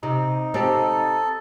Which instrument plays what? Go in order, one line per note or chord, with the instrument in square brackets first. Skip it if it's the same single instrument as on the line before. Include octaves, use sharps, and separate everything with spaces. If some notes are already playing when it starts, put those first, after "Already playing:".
[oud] C3 [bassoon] D#4
[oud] C4 G4 [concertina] A4